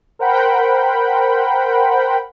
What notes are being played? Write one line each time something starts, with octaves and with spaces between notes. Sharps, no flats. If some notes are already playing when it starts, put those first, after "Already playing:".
A#4 C5 F#5 G5 B5